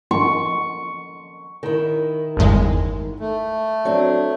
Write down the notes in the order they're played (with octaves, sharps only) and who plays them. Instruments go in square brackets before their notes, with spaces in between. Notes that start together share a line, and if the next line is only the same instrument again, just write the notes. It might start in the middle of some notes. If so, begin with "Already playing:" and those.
[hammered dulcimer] C#6
[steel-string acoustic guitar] D#3 E4
[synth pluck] G1 E2 G#3
[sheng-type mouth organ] A3
[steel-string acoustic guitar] F#3 C4 D4